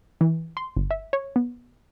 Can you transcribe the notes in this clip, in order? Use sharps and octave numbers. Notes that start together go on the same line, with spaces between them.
E3
C6
G1
E5
C#5
B3